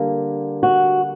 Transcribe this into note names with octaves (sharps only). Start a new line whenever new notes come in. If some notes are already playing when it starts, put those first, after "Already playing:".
Already playing: D3 G3 A#3
F#4